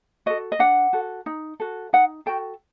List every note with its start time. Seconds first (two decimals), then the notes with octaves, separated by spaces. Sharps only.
0.26 F#4 A4 D#5
0.52 D#5
0.59 D4 F#5
0.93 F#4 A4
1.26 D#4
1.60 F#4 A4
1.93 D#4 F#5
2.26 F#4 A4 G5